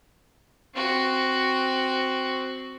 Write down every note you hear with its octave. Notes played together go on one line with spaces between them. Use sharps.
C4 F#4